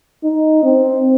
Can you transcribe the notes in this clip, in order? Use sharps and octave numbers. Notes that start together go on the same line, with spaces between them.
D#4
C4